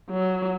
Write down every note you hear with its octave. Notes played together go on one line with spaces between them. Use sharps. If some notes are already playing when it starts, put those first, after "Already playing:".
F#3